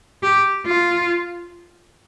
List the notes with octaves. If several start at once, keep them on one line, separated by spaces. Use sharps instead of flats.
G4
F4